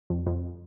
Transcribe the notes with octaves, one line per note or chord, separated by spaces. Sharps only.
F2
F2